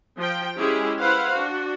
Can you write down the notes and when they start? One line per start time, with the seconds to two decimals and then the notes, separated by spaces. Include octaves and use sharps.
0.18 F3 G5
0.57 G#3 C#4 E4 G4 G#4
1.01 E4 B4 C5 F5 F#5
1.33 D4 F#4